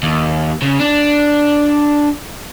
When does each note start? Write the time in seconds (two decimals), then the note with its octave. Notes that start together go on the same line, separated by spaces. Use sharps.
0.03 D#2
0.62 C#3
0.80 D4